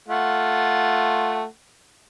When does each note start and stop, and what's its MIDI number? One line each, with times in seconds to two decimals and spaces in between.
0.08 1.44 57
0.08 1.44 65
0.08 1.44 78